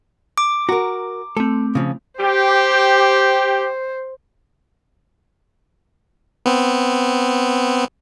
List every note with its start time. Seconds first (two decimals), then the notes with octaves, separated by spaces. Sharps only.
0.38 D6
0.69 F#4 A#4 A#5
1.37 A3 C4 A4
1.75 C#3 F3
2.19 G4 C5
6.46 B3 C4